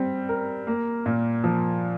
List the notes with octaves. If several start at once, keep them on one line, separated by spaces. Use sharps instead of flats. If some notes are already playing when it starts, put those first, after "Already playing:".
Already playing: G3 C4
A#4
A#3
A#2
F3